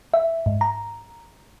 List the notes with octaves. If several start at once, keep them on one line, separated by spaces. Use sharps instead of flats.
E5
G#2
A#5